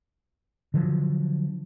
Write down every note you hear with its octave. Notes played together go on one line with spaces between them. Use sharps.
D3 F3 F#3